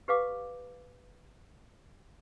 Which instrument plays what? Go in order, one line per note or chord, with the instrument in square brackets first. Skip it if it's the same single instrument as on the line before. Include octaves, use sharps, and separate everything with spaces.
[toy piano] G4 B4 F5 D6